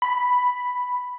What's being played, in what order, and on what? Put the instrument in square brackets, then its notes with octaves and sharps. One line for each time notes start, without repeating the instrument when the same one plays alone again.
[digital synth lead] B5